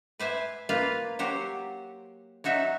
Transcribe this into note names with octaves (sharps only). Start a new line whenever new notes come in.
B4 C5 E5 G#5
A#3 F4 B4 F5
F#3 G4 C5
F#3 D#4 F#4 E5